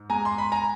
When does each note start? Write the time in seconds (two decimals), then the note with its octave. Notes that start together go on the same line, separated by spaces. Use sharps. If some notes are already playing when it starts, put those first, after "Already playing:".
Already playing: G#2
0.10 G#3 G#5 A#5
0.25 C6
0.38 B5
0.52 G#5 A#5